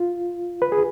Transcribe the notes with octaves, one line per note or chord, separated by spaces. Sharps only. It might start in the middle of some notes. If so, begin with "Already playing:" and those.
Already playing: F4
B4
G#4